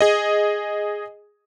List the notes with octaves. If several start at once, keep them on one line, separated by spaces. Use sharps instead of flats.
G#4 D#5